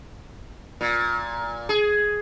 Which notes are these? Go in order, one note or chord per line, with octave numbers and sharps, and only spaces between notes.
A#2
G#4